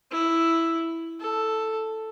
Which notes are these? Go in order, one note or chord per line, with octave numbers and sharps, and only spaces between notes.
E4
A4